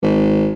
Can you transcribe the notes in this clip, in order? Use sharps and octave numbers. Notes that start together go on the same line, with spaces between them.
G#1